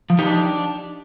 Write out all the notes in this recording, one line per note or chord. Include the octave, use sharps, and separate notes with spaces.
F3
D#4 G4
D4